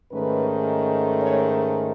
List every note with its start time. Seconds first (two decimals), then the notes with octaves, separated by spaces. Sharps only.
0.12 G#2 D#3 A3 C#4 B4
1.21 C#5